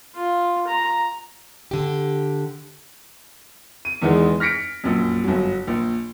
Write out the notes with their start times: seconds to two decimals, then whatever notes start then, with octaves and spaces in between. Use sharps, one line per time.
0.16 F4
0.67 A#5
1.71 D3 G4
3.85 D#7
4.02 E2 D#3 E3 G#3 B3
4.40 F6 A#6 B6 C#7 D7
4.84 A#1 F#2
5.24 G1 F#3
5.67 A#1